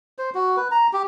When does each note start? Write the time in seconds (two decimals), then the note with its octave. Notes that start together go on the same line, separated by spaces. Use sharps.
0.18 C5
0.35 F#4
0.57 B4
0.71 A#5
0.93 G4